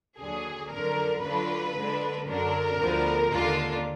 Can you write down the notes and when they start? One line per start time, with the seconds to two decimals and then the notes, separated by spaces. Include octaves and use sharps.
0.19 D#2 D3 F#3 D4 G#4
0.72 F2 D3 F#3 A#4
1.24 D3 F#3 D4 F4 B4
1.77 D3 G#3 D4
2.28 F#2 D3 F#3 D4 A#4
2.81 D2 D3 F3 B3
3.33 D#2 D3 G#3 D4 F4